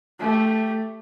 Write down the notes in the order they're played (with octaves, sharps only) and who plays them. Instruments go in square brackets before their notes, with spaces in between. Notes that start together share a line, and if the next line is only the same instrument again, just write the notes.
[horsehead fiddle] A3 G4